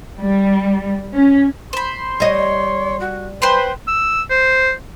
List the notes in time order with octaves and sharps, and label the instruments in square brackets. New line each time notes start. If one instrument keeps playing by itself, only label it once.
[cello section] G3
C#4
[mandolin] C5 B5 [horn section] C6
[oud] G3 D#5 [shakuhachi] C#5
[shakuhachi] F#4
[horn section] B4 [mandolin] C5 B5 C6 [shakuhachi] G5
[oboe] E6
C5